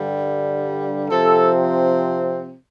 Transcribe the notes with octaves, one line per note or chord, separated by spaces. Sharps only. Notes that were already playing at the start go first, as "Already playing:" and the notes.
Already playing: G2 D3 G3
C3 F3 C4 A4